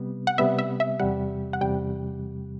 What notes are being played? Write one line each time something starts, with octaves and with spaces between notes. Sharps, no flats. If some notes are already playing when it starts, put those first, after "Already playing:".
Already playing: C3 G3 B3
F#5
C3 G3 B3 E5
E5
E5
E2 C3 G3 F#5
F#5
E2 C3 G3 G5